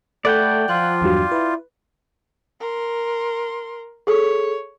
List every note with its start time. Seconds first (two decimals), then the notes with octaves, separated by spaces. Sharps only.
0.25 A3 A4 D5 E5 F#5 G5 B5
0.69 F3 F4 F#6
1.01 E2 G2 F#3
1.31 E4 B4
2.60 A#4 C6
4.07 G#4 A4 C#5